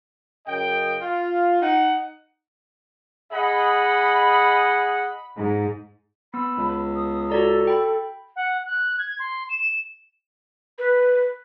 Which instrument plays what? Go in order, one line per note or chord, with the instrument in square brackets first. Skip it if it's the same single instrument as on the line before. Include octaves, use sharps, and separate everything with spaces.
[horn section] F#2 C#3 D#5 G5
F4
D#4 F#5
[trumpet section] G#4 D#5 F#5 [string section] B5
[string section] G#2
[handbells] B3 E6 [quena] B5
[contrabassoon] C#2
[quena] D#6
[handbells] F#4 D5 A#5 [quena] A4
[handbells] G5 B5
[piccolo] F#5
F#6
G#6
C6
E7
[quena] B4